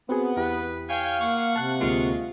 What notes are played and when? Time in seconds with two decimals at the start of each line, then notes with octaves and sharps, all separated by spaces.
0.09 B3 C4 F#4 G#4
0.37 E2 E4 G4 B4
0.90 C#5 F5 G5 G#5
1.20 A#3 F#5 C#6
1.56 C3 A5 F#6
1.80 D2 G#3 A#3 F4